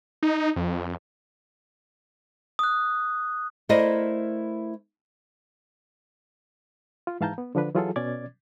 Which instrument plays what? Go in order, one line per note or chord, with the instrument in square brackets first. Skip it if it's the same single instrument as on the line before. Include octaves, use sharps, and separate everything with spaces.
[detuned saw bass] D#4
F2
[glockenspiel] D#6 F#6
[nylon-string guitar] A3 E4 A#4 C5 D5 D#5
[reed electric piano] F4
G#2 E3 F5 A5 A#5 G6
B3
D3 F3 D4 B4
E3 F#3 F4 G#4 A4
B2 C#4 D5 D6 G#6 A6